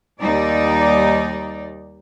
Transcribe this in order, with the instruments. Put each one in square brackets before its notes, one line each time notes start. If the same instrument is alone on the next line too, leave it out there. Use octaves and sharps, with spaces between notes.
[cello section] D#2 G3 D#4 D5